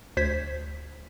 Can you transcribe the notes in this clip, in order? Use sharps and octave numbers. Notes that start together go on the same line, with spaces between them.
D2 C5 G#6 B6